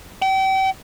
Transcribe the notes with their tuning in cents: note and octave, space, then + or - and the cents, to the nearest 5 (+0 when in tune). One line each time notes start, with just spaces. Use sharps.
G5 -35